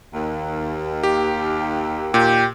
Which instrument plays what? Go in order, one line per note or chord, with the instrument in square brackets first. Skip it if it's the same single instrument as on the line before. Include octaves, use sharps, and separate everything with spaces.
[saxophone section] D#2
[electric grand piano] G4
[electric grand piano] A#2 [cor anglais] G4